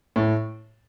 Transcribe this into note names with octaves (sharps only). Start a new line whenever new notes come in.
A2